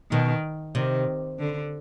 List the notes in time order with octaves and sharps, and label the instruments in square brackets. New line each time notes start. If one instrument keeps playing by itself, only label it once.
[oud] B2 [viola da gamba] D#3
[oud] C3 [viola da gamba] D#3
[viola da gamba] D3